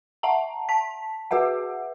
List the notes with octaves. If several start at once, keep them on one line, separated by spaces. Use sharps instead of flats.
E5 F#5 A5 A#5
A5 B6
F#4 G#4 B4 E5 F#5